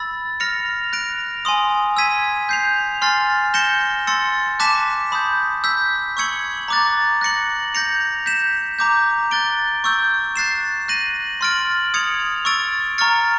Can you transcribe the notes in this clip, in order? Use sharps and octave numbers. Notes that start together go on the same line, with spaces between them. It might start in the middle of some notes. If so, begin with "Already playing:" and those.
Already playing: B5 E6 A6
F6 A#6 C#7 F7
F#6 A#6 D7 F7
G#5 C6 D#6
E6 G#6 B6 D#7
G6 C7 F7
G#5 C6 F6 A6 C7
G6 A#6 C#7 E7 G7
C6 E6 A6 C#7
A5 D6 F#6 B6 E7
B5 D#6 G6
E6 G6 B6
C#6 E6 G#6 C#7 F#7
A#5 D6 F#6 A6
F#6 A#6 C#7 F#7
G6 A#6 C#7 F7
G6 B6 E7
A#5 D6 G6
F#6 A6 D7 G7
C#6 E6 G6
F#6 A6 C7 E7
F#6 A#6 D#7 F#7
C6 F6 A6 D7 F#7
D#6 G#6 C#7 F7
C#6 E6 A6 D7
A#5 C#6 F6 A6 C#7